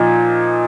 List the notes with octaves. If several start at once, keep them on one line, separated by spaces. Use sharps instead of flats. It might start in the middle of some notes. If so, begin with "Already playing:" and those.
Already playing: A#2 F3 D#4